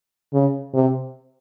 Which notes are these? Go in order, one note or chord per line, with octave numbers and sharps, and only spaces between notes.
C#3
C3